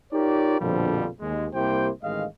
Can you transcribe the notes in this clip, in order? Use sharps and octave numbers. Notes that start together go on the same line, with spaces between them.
D#4 F4 G4 A#4 C#5 D5
A#1 F2 B2 D3 F3 G3
D#2 G#3
C2 A#3 E4 G4 C5 G5
A1 D#3 G#3 D#5 F5